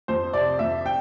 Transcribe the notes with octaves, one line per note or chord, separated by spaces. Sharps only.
F2 C5
C3 D5
F2 E5
G5